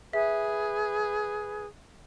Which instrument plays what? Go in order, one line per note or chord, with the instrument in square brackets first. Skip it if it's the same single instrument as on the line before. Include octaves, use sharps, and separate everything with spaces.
[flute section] G#4 B4 [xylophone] E5